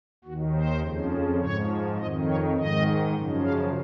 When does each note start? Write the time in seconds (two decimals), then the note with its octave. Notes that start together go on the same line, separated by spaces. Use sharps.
0.24 D#2 D#3 F#4
0.54 C5
0.82 F2 C#3 F3
1.40 G#2 F3 C#5
1.98 F2 D#3 D#5
2.28 C#5
2.56 G#2 D#3 D#5
3.15 F#2 C#3 F3
3.44 F5